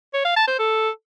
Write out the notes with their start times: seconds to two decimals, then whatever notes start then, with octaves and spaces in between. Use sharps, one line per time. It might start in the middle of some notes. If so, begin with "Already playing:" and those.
0.14 C#5
0.25 F5
0.36 A5
0.48 C5
0.59 A4